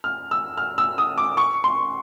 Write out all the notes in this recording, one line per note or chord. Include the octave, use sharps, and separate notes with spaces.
F6
E6
F6
E6
D#6
D6
C#6
C6